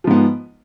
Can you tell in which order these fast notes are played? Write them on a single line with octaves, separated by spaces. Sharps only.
F3 G#2 B3